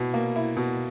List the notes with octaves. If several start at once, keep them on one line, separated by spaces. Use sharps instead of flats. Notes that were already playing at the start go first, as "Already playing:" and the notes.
Already playing: B2 E4
A#3
E4
B2